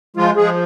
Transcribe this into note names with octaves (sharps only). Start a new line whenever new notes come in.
F3 G#3 F4
F3 G#3 G#4